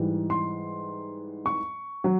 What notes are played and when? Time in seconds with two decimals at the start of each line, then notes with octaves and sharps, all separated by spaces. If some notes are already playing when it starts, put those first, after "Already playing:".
Already playing: G#2 E3 G3
0.30 C6
1.46 C#6
2.04 F#3